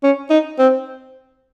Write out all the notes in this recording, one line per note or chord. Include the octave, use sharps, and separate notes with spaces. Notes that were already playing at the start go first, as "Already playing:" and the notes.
C#4
D#4
C4